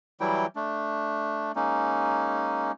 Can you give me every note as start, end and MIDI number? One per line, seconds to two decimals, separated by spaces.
0.20 0.46 52
0.20 0.46 54
0.20 0.46 55
0.20 0.46 64
0.20 0.46 79
0.56 1.52 57
0.56 1.52 62
1.56 2.72 56
1.56 2.72 58
1.56 2.72 61
1.56 2.72 63